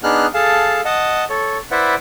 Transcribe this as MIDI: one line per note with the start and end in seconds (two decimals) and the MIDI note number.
0.03 0.26 59
0.03 0.26 62
0.03 0.26 63
0.03 0.26 68
0.03 0.26 89
0.03 0.26 90
0.34 0.81 68
0.34 0.81 69
0.34 0.81 77
0.34 0.81 81
0.85 1.24 75
0.85 1.24 78
0.85 1.24 81
1.30 1.58 69
1.30 1.58 73
1.71 1.95 64
1.71 1.95 71
1.71 1.95 72
1.71 1.95 74
1.71 1.95 76
1.71 1.95 78